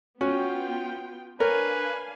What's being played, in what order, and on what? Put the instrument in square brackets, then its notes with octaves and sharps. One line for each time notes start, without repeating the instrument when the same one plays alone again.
[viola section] B3 F4 G5 [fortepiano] C#4 [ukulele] F#4
[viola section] D4 F5 G#5 [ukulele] A#4 [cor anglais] B4 [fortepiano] C#5